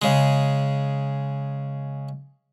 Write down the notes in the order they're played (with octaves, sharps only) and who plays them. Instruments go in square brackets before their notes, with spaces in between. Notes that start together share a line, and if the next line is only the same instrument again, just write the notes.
[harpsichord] C#3 G#3